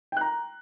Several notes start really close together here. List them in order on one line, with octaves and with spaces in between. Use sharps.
G5 F#6 A#5